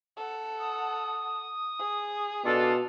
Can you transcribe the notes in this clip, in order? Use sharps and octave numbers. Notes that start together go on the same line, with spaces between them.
A4 F#5
D#6
G#4
B2 D4 F4 A4